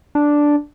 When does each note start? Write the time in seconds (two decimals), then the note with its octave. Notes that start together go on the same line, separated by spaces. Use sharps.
0.15 D4